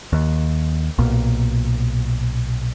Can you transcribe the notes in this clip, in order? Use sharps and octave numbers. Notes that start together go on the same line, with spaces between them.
D#2
B1 A#2